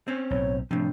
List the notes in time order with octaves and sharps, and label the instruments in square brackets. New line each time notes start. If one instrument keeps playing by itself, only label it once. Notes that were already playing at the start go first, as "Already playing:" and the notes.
[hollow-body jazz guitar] C4 C#4
[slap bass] B1 A2 [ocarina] C#5
[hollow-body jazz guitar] A2 C3 [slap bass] F3 [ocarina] D4